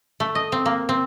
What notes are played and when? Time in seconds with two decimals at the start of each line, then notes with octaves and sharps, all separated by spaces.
0.20 A3
0.35 D#5
0.52 C4
0.66 A#3
0.89 C4